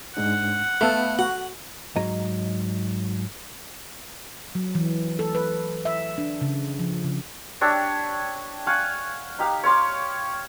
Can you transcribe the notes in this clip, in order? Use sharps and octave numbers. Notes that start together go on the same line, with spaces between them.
G#2 G#3 D4 F#5
A3 B3 A4 F5 B5
F#4 F#5
G#2 F#3 D#5 A#5
F#3
E3
A4
B4
E5
D4
C#3
F3
C#3
D4 G4 C#5 E5
F5 F#5 G#5 C#6
D#4 G4 F5
C#5 F5 C6 D6